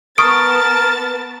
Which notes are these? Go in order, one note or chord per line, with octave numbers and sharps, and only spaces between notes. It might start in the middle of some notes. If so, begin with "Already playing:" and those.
B3 A#4 A5 C#6 D#6 A6 D7